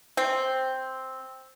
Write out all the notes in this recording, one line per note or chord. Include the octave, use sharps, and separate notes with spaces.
C4